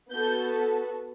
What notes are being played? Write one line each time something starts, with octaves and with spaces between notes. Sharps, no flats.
B3 F#4 A4 G6